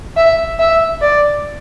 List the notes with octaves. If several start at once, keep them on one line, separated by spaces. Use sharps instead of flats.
E5
E5
D5